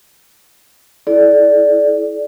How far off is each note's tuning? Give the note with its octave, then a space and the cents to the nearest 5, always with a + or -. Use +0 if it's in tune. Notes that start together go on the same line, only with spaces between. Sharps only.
E4 +0 A4 -45 D5 +0